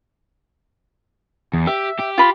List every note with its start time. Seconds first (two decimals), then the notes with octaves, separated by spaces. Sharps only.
1.54 E2
1.67 G4 E5
2.00 G4
2.18 F4 B5 C6